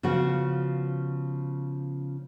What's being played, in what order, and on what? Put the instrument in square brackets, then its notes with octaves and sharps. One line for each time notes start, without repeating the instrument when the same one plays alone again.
[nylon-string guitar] C#3 F3 B3 F#4